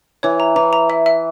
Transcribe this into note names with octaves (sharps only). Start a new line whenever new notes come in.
E3 C#5
A#5
E3 A#5
A#5
E5
E5